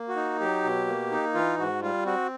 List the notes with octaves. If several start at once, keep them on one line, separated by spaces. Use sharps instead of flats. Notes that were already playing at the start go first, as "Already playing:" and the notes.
Already playing: A#3
F#4
D#4
F#3 G4
B2
A#3
D#4
E3 F4
G#2 F#4
G3 F4
C4 F#4